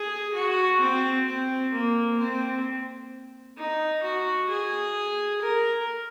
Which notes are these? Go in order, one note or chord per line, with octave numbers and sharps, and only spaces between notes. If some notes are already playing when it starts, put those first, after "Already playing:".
Already playing: G#4
F#4
C4
C4
A#3
C4
D#4
F#4
G#4
A#4